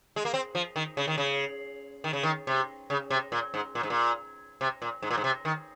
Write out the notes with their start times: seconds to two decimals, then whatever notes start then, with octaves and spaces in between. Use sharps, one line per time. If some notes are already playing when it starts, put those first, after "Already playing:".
0.16 G#3
0.25 A#3
0.34 C4
0.55 F3
0.76 D#3
0.97 C#3
1.08 D#3
1.18 C#3
2.04 D#3
2.13 C#3
2.23 D#3
2.47 C3
2.90 C#3
3.10 C3
3.32 A#2
3.54 G#2
3.75 A#2
3.83 G#2
3.90 A#2
4.61 C3
4.82 A#2
5.02 G#2
5.10 A#2
5.17 G#2
5.24 C3
5.45 D#3